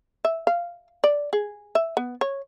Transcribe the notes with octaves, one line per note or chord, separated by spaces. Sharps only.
E5
F5
D5
G#4
E5
B3
C#5